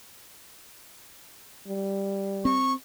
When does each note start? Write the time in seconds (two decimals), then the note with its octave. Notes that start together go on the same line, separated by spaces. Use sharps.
1.68 G3
2.45 C4 C#6